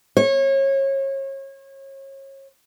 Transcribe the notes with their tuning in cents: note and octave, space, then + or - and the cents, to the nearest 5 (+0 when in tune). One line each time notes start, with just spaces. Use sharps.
C#5 -30